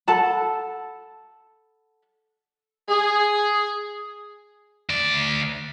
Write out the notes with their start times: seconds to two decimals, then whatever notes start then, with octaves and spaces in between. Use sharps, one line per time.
0.08 A4 F#5 A5 B5
2.89 G#4
4.90 D2 D5